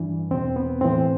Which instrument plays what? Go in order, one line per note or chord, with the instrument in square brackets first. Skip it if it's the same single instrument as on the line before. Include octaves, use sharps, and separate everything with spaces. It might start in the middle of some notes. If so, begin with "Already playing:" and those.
Already playing: [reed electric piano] G2 E3 D4
E2 B2 C4
B3
A2 E3 C4